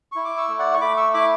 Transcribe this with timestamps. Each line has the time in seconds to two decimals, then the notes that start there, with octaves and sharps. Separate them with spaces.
0.12 E4 C#6
0.25 D6
0.37 C#6 E6
0.48 A3
0.59 D5 F#5
0.74 C#6
0.81 A3 B5 D6
0.97 C#6 E6
1.14 E4 B5 D6